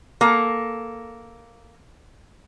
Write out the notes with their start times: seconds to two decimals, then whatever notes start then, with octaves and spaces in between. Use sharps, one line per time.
0.21 A#3 A4